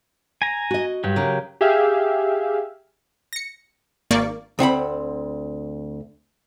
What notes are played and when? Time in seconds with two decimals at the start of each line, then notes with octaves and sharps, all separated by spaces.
0.42 G#5 A#5
0.71 F#4 D#5
1.04 G2 F#3 G4
1.16 C#3 A#4
1.61 G4 G#4 E5 F5
3.33 A#6 C#7
4.11 G#1 A#3 D5 C#6
4.59 D2 C4 F#5 B5